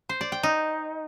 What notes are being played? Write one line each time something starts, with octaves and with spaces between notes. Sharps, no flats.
C5
D5
G5
D#4